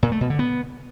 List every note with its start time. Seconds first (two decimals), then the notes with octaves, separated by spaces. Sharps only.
0.03 A#2
0.12 A3
0.21 B2
0.30 D3
0.39 B3